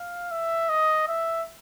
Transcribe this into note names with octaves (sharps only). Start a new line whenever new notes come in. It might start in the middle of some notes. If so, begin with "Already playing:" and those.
Already playing: F5
E5
D#5
E5